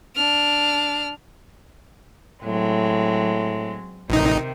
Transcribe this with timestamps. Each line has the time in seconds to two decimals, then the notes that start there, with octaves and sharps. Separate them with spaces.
0.16 D4 F6
2.44 A2 F#3 G#3 C4
4.10 A1 C3 D#3 D#4